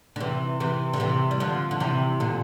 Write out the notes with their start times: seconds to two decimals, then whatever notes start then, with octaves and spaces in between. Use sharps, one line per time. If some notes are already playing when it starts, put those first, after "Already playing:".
0.16 D3
0.20 C3 E3
0.60 C3 E3
0.93 D3
1.00 C3 E3
1.31 G3
1.40 D3 F3
1.71 D3
1.80 C3 E3
2.20 A#2 D3